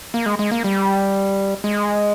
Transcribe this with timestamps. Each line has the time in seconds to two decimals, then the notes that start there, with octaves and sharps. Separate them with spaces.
0.14 A#3
0.26 G#3
0.39 G#3
0.52 A#3
0.64 G3
1.64 G#3